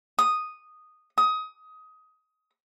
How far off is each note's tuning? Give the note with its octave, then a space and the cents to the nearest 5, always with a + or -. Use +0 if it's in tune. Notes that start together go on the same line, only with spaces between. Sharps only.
D#6 -5
D#6 +20